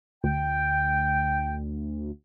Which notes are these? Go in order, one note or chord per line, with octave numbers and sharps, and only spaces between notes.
D2 G5